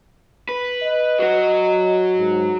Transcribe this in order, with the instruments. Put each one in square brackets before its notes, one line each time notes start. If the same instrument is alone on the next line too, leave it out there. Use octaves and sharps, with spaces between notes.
[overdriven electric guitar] B4
[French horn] D#5
[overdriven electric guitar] F#3 F#4
[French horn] G#2